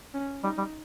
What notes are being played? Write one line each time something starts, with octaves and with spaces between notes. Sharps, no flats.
C#4
G3 D#4
G3